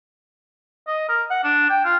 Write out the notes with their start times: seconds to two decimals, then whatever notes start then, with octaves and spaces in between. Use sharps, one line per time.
0.87 D#5
1.09 A#4
1.30 F#5
1.43 D4
1.70 G5
1.84 F4